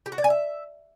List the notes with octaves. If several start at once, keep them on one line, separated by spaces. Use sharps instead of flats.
G4
F#4
D5
G#5
E5